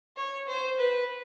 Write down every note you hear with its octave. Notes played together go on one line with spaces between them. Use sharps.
C#5
C5
B4